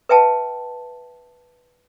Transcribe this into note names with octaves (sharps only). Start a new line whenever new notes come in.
B4 E5 G5 A5